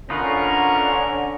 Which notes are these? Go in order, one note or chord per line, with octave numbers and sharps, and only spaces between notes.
D3 C#4 D#4 F4 A#4 B4 C#6